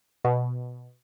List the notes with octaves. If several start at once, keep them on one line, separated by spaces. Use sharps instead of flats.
B2